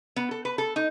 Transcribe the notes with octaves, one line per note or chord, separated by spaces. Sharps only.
B3
A4
B4
A4
D#4